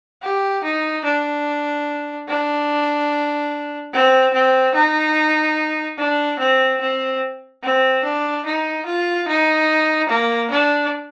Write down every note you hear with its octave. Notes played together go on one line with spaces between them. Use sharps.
G4
D#4
D4
D4
C4
C4
D#4
D4
C4
C4
C4
D4
D#4
F4
D#4
A#3
D4